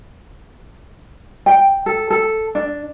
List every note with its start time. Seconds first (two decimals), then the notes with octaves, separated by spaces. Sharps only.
1.46 G5
1.86 A4
2.10 A4
2.55 D4